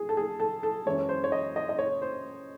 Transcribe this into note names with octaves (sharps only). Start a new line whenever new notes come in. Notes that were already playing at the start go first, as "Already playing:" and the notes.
Already playing: G#4
A4
G#4
A4
A4
F#2 E3 G#3 C#5
C5
C#5
D#5
D#5
D#5
C#5
C5